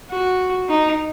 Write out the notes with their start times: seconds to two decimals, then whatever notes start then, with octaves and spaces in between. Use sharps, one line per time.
0.11 F#4
0.69 D#4